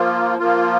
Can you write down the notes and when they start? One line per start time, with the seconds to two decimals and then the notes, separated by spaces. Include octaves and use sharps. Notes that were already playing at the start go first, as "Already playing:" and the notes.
Already playing: F3 A#3 F4
0.39 F3 A#3 F4